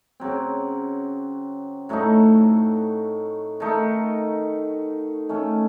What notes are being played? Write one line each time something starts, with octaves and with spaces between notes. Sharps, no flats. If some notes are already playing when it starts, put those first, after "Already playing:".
C#3 F#3 C4
A2 F#3 A3 D#4
D#3 A3 D#4
D#3 A3 C#4